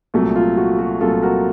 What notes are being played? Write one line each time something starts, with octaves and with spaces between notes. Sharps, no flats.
C2 A#2 F#3 A3
F4
F#4
F#4
C2 A#2 F#3 A3 F4 A4
F#4 A#4